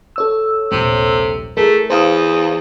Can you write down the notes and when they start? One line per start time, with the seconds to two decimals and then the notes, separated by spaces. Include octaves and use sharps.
0.16 A4 C#5 E6
0.72 D#1 A#1 C3
1.57 A3 E4 G#4 A#4
1.90 E2 C5 F5 D#6